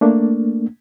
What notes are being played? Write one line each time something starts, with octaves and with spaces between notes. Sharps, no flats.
A3 A#3 D4